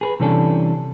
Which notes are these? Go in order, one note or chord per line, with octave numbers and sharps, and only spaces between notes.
G#4 A#4 B4
C3 E3 G3 C#4 D4 A4